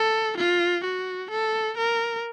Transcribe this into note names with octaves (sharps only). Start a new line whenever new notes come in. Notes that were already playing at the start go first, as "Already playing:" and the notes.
Already playing: A4
F4
F#4
A4
A#4